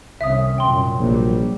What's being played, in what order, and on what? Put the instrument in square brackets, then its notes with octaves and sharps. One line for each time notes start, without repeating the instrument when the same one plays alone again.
[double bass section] C2 D#3 C#4 [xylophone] E5 D#6
[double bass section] C2 F#2 A#2 [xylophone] G5 C6
[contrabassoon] A#1 [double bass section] F#3 G3